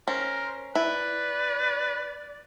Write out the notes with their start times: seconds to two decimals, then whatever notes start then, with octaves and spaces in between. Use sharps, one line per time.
0.08 C#4 A#4 C5
0.75 E4 B4 D5